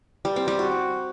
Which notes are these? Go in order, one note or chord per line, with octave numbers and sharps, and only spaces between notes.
G3
C4
G3
F#4